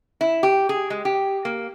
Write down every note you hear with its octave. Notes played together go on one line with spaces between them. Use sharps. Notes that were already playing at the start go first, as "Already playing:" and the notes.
E4
G4
G#4
G#3
G4
A#3